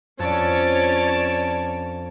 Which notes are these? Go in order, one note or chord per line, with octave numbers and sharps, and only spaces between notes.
F2 C#4 D4 C#5 D5 A5